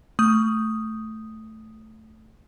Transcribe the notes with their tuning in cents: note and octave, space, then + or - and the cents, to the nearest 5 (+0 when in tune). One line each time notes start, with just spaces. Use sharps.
A3 +0 D#6 +0